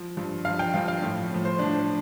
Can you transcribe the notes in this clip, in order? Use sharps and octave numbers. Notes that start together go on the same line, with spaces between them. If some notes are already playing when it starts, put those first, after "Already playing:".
Already playing: F3
G2 F3
G2 F3 F5
G5
G2 F3 F5
F5
A2 F3
A2 F3
C5
A2 F3 D4